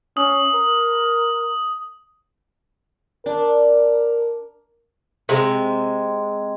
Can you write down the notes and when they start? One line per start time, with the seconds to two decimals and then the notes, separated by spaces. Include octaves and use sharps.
0.17 C#4 D#6
0.54 A#4
3.26 D4 A#4
5.29 C3 G#3